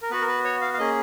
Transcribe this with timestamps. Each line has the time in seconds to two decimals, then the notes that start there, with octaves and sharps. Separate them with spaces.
0.02 A#4
0.11 B3 F#4 B4
0.21 A#4
0.28 B4
0.44 C#5
0.61 F5
0.74 F5
0.78 A#3 C#4 G#4 D#5